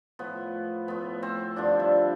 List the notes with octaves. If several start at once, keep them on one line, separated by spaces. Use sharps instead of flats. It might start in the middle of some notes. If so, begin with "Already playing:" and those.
A2 F3 B3
A2 F3 B3
C4
G2 D3 F3 D4
E4